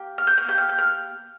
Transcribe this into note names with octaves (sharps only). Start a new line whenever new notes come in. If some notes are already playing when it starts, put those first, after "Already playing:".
Already playing: A#3 G4
F6
G6
F6
A#3 G4 G6
F6
G6
F6